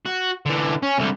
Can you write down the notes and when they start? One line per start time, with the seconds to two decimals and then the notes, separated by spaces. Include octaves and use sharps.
0.05 F#4
0.46 D3 E3
0.83 C#4
0.99 C2 D3